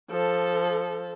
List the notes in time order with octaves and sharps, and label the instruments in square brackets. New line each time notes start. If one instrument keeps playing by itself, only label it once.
[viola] F3 A4